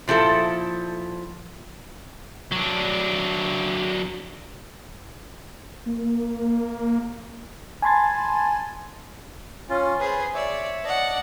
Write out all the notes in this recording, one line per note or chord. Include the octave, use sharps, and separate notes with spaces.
A#2 F3 E4 A4
F#3 D4
A#3
G#5 A5 B5 C6 G#6 A6
C#4 F4
G#4 B4 C5
C#5 D5 E5
D5 D#5 F#5 A5